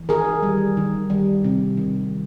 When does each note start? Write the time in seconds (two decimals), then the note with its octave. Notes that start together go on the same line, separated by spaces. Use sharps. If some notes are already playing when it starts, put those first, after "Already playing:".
Already playing: E3
0.09 D#3 G#4 A#4
0.43 G3
0.77 D#3
1.10 G3
1.44 C3
1.77 D#3